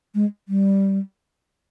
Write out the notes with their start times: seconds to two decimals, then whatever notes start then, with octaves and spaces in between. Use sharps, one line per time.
0.15 G#3
0.48 G3